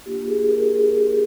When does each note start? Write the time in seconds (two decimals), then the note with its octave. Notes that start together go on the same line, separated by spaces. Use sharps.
0.06 A#3 D4 F4 G4
0.28 G#4
0.49 A#4
0.71 G#4
1.03 G4